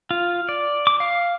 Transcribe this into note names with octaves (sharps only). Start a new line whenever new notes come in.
F4
D5
D6
F5